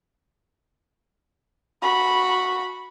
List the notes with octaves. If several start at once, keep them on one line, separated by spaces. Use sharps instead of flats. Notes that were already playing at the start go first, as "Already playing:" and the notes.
F#4 B5